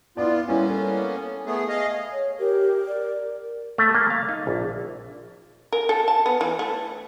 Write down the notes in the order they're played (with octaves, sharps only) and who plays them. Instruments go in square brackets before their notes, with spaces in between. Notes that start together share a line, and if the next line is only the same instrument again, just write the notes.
[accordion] B3 F4 [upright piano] E4 D5
[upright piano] G3 E4 [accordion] A#3 B3 C#4
[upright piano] A4
[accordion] A3 B3 G#4
G#4 D#5 F5
[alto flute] C#5
[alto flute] G4 [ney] A#4
[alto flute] D5
[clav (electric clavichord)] A3
A#3
F5
D#4
A#1
[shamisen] A#4
A4
A5
B3
E3
A3